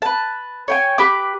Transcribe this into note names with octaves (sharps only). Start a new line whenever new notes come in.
B4 A5
C#5 G5 G#5
G4 B4 D6